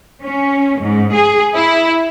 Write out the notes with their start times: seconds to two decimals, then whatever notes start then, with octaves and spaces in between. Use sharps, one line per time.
0.23 C#4
0.81 G#2
1.14 G#4
1.56 E4